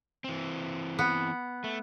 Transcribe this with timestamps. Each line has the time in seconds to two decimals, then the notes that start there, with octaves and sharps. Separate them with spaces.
0.24 E3 C4
0.99 B3
1.64 A3